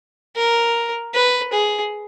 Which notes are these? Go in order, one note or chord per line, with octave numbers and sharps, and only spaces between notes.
A#4
B4
G#4